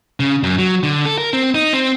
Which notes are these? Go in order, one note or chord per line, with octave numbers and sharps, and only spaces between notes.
C#3
F#2
F#3
D3
A4
A#4
C4
D#4
C4